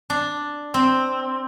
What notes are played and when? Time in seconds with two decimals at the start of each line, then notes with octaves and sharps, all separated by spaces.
0.10 D4
0.74 C4